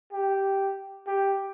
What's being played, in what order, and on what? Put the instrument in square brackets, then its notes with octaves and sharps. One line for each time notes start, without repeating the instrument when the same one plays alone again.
[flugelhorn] G4
G4